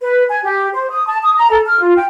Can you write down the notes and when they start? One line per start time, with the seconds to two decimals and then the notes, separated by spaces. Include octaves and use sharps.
0.01 B4
0.29 G#5
0.42 G4
0.74 C5
0.90 D#6
1.07 A5
1.23 D#6
1.36 A#5
1.50 A4
1.65 F6
1.79 F4
1.96 G5